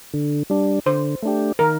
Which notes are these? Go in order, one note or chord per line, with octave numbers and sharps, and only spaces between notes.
D3
G3 D4
D3 C5
A3 D4 G4
D#3 A#4